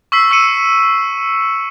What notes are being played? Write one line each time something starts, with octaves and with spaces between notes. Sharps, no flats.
C#6 E6 B6 C7
C#6 E6 C#7 D#7 E7